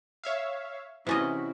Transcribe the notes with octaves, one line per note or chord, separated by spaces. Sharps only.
C#5 E5 F5
C3 E3 C#4 E4 F#4 D#5